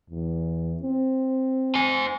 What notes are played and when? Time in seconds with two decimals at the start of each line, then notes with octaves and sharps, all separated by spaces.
0.10 E2
0.83 C4
1.75 C5 G#5